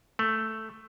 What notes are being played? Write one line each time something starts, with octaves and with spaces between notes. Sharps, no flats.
A3